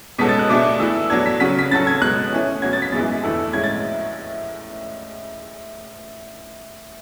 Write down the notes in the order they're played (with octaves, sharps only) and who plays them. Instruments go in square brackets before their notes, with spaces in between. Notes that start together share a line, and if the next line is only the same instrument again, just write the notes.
[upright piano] B2 G#3 C#4 F#4 A4 [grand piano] B6
[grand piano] A6
F#6
[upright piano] B2 A3 D4 G#4 [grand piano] D6
[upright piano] E3 A3 E4 [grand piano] E6
[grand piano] E6
[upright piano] F#3 B3 D4 A4 [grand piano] G#6
[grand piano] B6
[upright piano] C#3 F#3 C#4 F#4 [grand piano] B6
[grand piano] B6
[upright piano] C#3 F#3 C#4 F#4 A4 [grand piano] A6
[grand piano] G#6
[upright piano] B2 G#3 C#4 [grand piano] F#6
[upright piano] E3 A3 C#4
[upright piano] B2 F#3 C#4 F#4 [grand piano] G#6
[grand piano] A6
B6
[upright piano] F#2 E3 G#3 B3 [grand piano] A6
[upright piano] E2 D3 A3 E4 A4
[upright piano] A2 G#3 C#4 [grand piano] G#6
[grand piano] A6